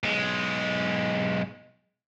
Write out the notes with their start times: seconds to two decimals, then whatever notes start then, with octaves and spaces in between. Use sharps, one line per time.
0.03 B1 G#3